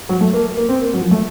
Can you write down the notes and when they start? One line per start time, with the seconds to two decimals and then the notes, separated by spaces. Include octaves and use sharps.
0.09 F#3
0.21 A3
0.34 A#3
0.57 A#3
0.69 C4
0.82 A#3
0.94 F#3
1.01 F3
1.11 A3